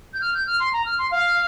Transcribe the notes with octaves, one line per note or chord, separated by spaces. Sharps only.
G6
F6
G6
F6
C6
A#5
F6
C6
F5